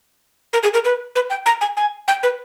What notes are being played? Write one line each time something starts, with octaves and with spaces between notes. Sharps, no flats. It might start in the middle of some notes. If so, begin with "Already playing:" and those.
A#4
G#4
A#4
B4
B4
G5
A#5
G#5
G#5
G5
B4